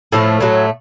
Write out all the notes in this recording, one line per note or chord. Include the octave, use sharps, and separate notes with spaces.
A2 F3 A3
A2 F#3 A3